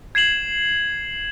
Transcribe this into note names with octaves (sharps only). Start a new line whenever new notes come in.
G#6 C7 E7 F#7